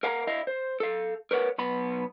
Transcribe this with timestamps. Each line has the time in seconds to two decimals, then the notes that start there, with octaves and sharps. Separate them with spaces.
0.03 A#4 F5 F#5 G#5 A#5
0.27 E4 D#5 F5
0.47 C5
0.80 A4 F5
1.31 A#4 B4 C#5 F#5
1.58 B1 B3 B5